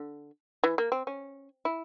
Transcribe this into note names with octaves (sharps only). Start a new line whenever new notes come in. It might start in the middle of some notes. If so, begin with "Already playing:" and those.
Already playing: D3
E3
A#3
C4
C#4
E4